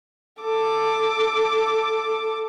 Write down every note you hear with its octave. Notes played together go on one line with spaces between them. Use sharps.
A4 D6